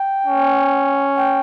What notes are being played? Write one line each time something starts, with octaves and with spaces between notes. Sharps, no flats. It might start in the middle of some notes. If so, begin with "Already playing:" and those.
Already playing: G5
C#4
G5